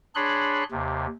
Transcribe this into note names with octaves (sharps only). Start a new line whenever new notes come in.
D4 G#4 C#5 B5 C6 F#6
D#2 C3